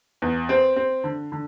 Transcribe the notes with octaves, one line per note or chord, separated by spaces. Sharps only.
E2
C4
C4
D3
D3